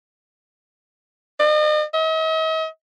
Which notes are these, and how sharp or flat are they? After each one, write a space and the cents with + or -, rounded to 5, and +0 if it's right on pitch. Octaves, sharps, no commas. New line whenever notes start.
D#5 -40
D#5 +45